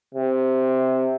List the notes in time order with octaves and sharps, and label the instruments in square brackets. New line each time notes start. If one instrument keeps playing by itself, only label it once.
[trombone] C3